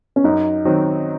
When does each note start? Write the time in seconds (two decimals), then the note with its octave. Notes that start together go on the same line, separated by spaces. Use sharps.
0.16 C#4
0.24 F#2 D#4
0.65 D#3 F#3 C4